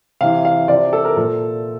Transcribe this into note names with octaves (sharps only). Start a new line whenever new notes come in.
C3 E3 F5
F5
C3 F3 D5
A4
A#4
A#2 F3 A4